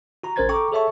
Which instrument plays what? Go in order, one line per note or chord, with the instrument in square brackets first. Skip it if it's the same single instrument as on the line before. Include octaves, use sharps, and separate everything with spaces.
[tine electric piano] F#4 A#5
A1 C#4 A#4 C5 G#6 A6
A4 G5 A#5 C#6 D6
G#4 A4 C#5 E5 A5 C#6